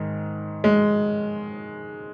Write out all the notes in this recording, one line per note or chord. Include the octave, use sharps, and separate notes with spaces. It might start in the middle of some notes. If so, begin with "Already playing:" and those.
Already playing: G#2 D#3
G#3